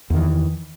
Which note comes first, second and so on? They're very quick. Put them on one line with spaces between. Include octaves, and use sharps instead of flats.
E2 D#3 E3